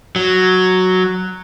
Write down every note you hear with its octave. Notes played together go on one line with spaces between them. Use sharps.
F#3